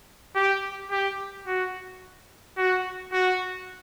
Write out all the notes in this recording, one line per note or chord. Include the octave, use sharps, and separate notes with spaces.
G4
G4
F#4
F#4
F#4